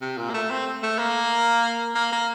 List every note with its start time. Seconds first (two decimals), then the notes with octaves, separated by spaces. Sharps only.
0.01 C3
0.18 A#2
0.30 A#3
0.34 A3
0.51 C4
0.83 A3
0.99 A#3
1.95 A#3
2.12 A#3